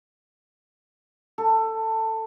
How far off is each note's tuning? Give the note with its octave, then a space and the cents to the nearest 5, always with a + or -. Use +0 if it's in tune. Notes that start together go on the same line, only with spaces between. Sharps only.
A4 +15